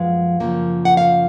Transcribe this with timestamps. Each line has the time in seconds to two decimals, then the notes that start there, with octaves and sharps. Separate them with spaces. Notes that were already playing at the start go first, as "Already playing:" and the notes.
Already playing: F#2 F3 G#3 B3 F5
0.40 F#2 C#3 F3 A#3
0.85 F#5
0.97 F5